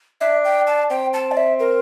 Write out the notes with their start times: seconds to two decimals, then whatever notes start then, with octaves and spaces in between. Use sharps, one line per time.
0.21 D4 E5
0.45 G5
0.67 A5
0.90 C4 G5
1.13 A5
1.31 D5
1.37 E5
1.60 A#4